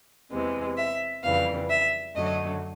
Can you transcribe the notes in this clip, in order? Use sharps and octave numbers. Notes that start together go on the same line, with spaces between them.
E2 C3 E3 G#3
E5
F2 C#3 E3 G3 F5
E5
F#2 D3 F#3 A3 D#5